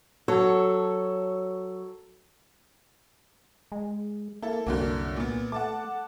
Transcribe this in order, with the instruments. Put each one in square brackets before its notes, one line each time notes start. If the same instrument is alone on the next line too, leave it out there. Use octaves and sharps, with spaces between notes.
[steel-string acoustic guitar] F#3 A4 C#5
[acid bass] G#3
[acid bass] A#3 [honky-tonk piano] E4 A4
[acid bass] C2 [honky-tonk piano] F#2 D3 A#3
[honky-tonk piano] A#2 B3
[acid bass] A3 [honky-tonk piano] F#5 A5 D6